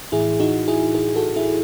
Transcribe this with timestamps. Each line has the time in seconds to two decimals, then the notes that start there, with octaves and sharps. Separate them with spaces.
0.12 A2 E3 E4 G#4
0.40 D#4 F#4
0.68 E4 G#4
0.95 E4 G#4
1.16 F#4 A4
1.36 E4 G#4